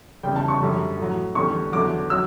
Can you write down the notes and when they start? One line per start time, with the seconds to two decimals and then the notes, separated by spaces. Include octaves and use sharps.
0.23 E2 C#3 G3 G5
0.36 A5
0.48 C#6
0.60 F#2 D3 G3
0.97 A2 F#3
1.35 E2 D3 G3 C#6
1.72 E2 D3 F#3 D6
2.10 F#3 E6